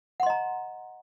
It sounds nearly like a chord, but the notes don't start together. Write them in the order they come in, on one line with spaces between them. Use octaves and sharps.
F#5 C6 D#5 A#5